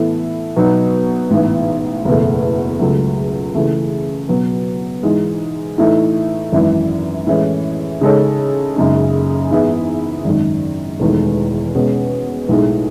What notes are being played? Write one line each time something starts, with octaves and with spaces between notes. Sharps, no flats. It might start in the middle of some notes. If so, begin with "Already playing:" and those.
Already playing: A2 E3 B3 E4 A4
B2 F#3 B3 D#4
A1 G#2 E3 B3
F#1 E2 B2 A3
C#2 C#3 F#3 A3
C#3 E3 A3
B2 F#3 B3
G#2 E3 G#3
A2 E3 A3 D#4
G#1 F#2 E3
A2 E3 G#3 C#4
C#3 G#3 D#4 A4 C#5
F#1 F#2 C#3 G#3 D#4
G#2 E3 B3 E4 G#4
G#1 F#2 D#3
E1 E2 D#3 A3
B2 G#3 C#4
B1 A2 G#3 D#4